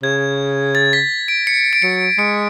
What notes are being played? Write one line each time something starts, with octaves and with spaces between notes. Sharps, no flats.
C#3 G#6
A6
B6
D7
C#7
D7
F#3 C#7
G#3 C#7